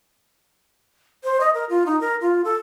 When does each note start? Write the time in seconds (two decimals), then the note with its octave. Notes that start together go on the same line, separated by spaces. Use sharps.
1.24 C5
1.40 D#5
1.54 A#4
1.69 F4
1.86 D#4
2.01 A#4
2.21 F4
2.44 A4